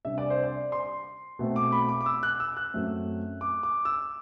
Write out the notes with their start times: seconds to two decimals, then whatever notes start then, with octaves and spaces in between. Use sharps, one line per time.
0.05 C3 G3 D4 E5
0.18 D5
0.30 C5
0.44 D5
0.72 C6
1.39 B2 A3 C4
1.56 D6
1.72 B5
1.89 D6
2.01 D6
2.06 E6
2.23 F#6
2.40 E6
2.57 F#6
2.73 F#2 F#3 A3 C4
3.41 D6
3.63 D6
3.85 E6